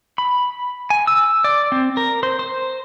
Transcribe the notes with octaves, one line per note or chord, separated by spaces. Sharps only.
B5
G#5
E6
D5
C4
A#4
C5
C5